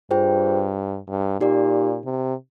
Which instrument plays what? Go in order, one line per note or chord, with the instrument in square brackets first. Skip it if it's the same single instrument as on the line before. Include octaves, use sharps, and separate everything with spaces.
[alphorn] G2 [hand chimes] F4 G#4 C5 G5
[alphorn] G2
[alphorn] A#2 [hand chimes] D#4 G4 D5
[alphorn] C3